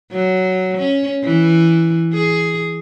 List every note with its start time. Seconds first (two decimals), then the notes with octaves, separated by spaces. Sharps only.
0.13 F#3
0.78 C#4
1.24 E3
2.14 G#4